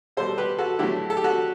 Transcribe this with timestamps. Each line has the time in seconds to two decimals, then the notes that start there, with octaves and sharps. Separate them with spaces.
0.17 B2 G3 A4 C5
0.38 G4 B4
0.58 F#4 A4
0.79 D3 F#3 A3 E4 G4
1.10 A4
1.17 G4
1.24 F#4 A4